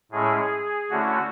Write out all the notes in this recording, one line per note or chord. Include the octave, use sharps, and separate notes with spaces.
A2 G#3 C#4 E4 G#4
D3 A3 C#4 E4 F#4